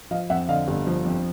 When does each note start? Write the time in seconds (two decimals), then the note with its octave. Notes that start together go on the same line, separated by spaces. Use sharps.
0.11 F3 D#5 F5
0.30 F2 E5 F#5
0.49 D3 D#5 F5
0.68 G1
0.87 F3
1.05 F2